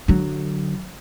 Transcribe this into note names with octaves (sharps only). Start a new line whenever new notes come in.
D3 F#3